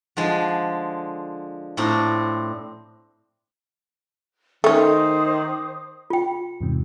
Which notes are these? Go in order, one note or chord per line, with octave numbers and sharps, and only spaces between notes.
D3 F3 G#3
A2 C4 D4 A#5
D#3 A3 C#4 A4 C5 D6 D#6
F4 G5
E2 G#2 C3